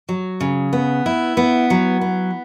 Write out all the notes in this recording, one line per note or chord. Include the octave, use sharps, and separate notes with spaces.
F#3
C#3
B3
E4
B3
F#3
B3